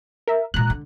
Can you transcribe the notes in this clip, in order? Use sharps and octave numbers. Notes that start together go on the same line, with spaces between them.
A#4 E5
A#2 G#3 A#5 F#6
D3